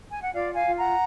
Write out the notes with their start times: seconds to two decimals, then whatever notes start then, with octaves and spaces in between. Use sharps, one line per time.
0.13 G#5
0.23 F#5
0.34 F4 D5 F5
0.56 F5 G#5
0.66 F4
0.78 F#5 A#5